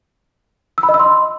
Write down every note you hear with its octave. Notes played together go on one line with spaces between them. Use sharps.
E6
B5
D#5
E6
C6